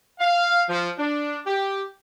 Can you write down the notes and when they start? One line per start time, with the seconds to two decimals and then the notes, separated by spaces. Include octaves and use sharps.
0.20 F5
0.69 F3
0.98 D4
1.46 G4